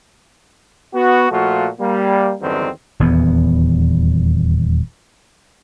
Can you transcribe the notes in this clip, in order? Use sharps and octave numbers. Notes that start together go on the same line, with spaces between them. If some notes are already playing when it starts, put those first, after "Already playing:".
B3 F#4
A#2 F3 A3 F4 F#4
G3 A#3
E2 G2 D3 D#3 F#3 C4
D#1 E2 E3 B3